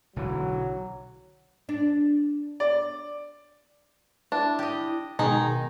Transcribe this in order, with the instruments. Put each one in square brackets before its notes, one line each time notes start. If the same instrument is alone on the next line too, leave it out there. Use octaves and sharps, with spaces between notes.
[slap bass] B1 D3 E3 [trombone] F#3
[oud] D4
[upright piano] D5
[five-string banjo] D4 [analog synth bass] E4
[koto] G4 D#5
[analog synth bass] B2 [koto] D#3 G#3 [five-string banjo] D#4